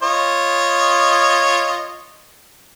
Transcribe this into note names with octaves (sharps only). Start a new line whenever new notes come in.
F4 C#5 D#5